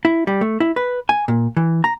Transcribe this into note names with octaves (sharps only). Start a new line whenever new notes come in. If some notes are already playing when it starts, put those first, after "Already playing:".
E4
G3
A3
E4
B4
G#5
A#2
E3
A#5